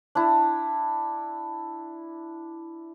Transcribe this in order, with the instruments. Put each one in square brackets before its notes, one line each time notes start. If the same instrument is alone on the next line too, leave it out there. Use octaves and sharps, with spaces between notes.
[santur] D4 E4